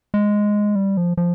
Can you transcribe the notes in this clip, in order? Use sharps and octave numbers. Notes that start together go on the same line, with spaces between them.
G#3
G3
F3
F3